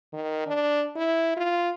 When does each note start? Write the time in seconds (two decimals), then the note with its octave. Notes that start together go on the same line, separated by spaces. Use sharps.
0.13 D#3
0.47 D4
0.96 E4
1.37 F4